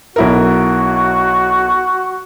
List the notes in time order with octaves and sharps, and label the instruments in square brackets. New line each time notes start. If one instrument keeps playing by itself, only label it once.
[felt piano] B1 E4 A#4 [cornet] F#4